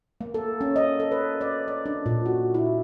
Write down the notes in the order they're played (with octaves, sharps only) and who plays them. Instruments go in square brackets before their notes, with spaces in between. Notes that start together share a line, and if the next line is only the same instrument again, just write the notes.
[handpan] A#3
A4
C#4
D#5
A4
B4
D5
D5
D4
A#2
F#4
E4